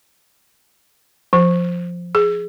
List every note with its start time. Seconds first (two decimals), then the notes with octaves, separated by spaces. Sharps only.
1.33 F3
2.15 G#4